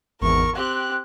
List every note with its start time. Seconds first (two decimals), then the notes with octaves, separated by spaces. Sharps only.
0.21 G#1 E2 A#4 C#6
0.55 C4 G4 F#6